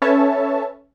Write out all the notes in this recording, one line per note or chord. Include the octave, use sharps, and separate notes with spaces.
C#4 A4 B4 C#5 E5 A5